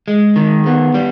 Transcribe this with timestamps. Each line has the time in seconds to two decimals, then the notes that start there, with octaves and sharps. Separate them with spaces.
0.08 G#3
0.36 D#3
0.66 B3
0.94 G3